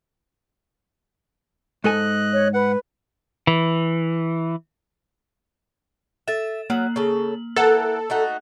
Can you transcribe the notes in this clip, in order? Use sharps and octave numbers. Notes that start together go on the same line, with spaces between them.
G#2 A4 D#5 G#5 F#6
C#5
B4 F#5
E3
A4 E5 A6 E7
F#3 A#3 F#7
C#3 A4
E3 A4 A#4 F#5
A3 D#4 F#4